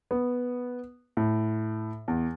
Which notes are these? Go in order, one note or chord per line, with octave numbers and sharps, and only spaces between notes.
B3
A2
E2